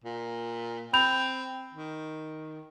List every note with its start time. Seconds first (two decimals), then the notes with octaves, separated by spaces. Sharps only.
0.04 A#2
0.93 C4 B5 G6 F7
1.74 D#3